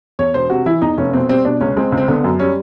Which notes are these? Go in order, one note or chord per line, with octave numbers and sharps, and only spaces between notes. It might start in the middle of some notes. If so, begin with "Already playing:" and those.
E2 C#5
E1 C5
C3 F#4
E3 E4
E2 D#4
F1 C#4
B2 C4
G3 C4
B2 D4
C#2 C#4
G#3 C4
C#2
C4
D3 B3
F#2
G3 C#4